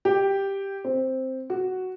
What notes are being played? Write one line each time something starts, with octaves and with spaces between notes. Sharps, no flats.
G4
C4
F#4